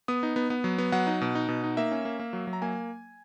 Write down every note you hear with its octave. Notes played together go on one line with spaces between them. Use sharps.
B3 D#6
D#4
B3
B3
F#3
B3
F#3 F#5
D#4
B2
D#4
B2
D#4
A#3 E5
C#4
A#3
A#3
F#3
F#3
A#5
A#3 G#5